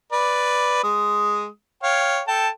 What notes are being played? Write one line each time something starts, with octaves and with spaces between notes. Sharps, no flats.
B4 D5
G#3 D#6
C#5 F5 G5
A4 G5 A5